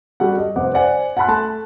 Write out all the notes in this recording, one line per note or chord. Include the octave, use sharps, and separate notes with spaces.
G3 F#4 A4 F#5
D#5
F1 C4 F#5 D6
C5 D5 F#5 G#5
F#5 G#5 A5 B5 C6 F#6
A3 A5